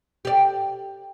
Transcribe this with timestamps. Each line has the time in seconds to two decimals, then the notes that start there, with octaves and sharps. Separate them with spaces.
0.25 G4 D5